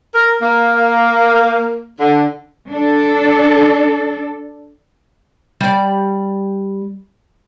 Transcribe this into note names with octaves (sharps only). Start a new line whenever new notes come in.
A#4
A#3
D3
D4 A4
G3 D5